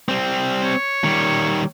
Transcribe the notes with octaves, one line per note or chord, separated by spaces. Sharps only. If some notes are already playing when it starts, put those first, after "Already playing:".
G3 C4
C#5
D#3 G3